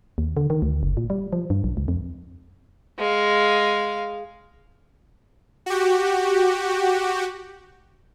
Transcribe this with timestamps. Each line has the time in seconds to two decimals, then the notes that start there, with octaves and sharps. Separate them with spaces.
0.18 D#2
0.37 D3
0.50 D#3
0.62 D2
0.83 F#1
0.97 A#2
1.10 G3
1.33 F3
1.50 G2
1.64 B1
1.77 C#2
1.88 F2
2.99 G#3 F5
5.66 F#4 G4